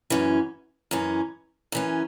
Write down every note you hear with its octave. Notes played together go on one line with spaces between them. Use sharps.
F#2 E3 C#4
F#2 E3 C#4
F#2 E3 C#4